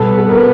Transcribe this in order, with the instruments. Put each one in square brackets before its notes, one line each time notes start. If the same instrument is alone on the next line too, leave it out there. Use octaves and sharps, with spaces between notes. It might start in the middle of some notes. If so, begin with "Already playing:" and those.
Already playing: [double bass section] B2 G3 B3 [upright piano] A4
[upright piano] A4
A#4